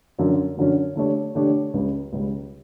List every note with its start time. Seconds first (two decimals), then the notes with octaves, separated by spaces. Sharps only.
0.18 F#2 D3 F#3 C#4
0.57 F#2 D3 F#3 C#4
0.96 D3 A3 D4 G4 C#5
1.35 D3 A3 D4 G4 C#5
1.74 C#2 C#3 G3
2.13 C#2 C#3 G3